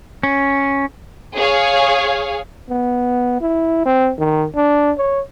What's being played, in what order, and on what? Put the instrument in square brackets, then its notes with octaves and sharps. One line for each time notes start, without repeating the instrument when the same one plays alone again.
[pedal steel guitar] C#4
[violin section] G#4 C#5 F5
[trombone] B3
E4
C4
D#3
D4
C#5